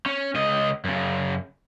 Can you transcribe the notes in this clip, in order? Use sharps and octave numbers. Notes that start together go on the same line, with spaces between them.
C#4
C#2 D#5
F#2 C#3